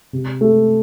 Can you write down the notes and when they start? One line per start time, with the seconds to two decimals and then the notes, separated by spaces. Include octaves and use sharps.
0.13 C3
0.41 A3